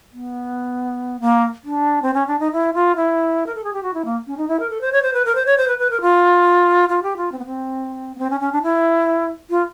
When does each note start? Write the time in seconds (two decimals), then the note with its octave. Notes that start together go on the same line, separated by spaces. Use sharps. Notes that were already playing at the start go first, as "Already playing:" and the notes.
0.12 B3
1.20 A#3
1.64 D4
2.02 C4
2.14 C#4
2.27 D4
2.40 D#4
2.52 E4
2.74 F4
2.96 E4
3.47 A#4
3.55 A4
3.64 G#4
3.73 G4
3.83 F#4
3.94 E4
4.05 A#3
4.27 C#4
4.37 D#4
4.48 E4
4.60 A#4
4.70 A4
4.81 C5
4.92 C#5
5.02 C5
5.14 B4
5.25 A#4
5.35 C5
5.46 C#5
5.57 C5
5.68 B4
5.79 B4
5.90 A#4
6.01 F4
6.89 F4
7.03 G4
7.17 F4
7.32 C4
7.39 B3
7.46 C4
8.16 B3
8.19 C4
8.30 C#4
8.41 C#4
8.52 D4
8.63 E4
9.50 F4